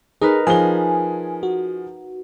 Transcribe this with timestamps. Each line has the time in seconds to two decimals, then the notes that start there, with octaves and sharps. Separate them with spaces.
0.21 D#4 G#4 A#4 B4
0.47 F3 G#4 G#5 G7
1.43 F#4